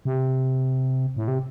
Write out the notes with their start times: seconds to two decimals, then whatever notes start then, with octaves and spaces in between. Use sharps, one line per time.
0.05 C3
1.17 A2
1.28 C3